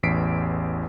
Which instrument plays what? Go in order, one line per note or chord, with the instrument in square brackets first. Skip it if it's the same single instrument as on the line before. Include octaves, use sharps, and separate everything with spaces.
[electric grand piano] A1 E2 B6 C7 D7